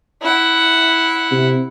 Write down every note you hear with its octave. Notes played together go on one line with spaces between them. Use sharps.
E4 F#5
C3